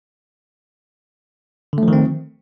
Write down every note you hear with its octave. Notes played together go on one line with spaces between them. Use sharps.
D3 D#3 F3 A3 C4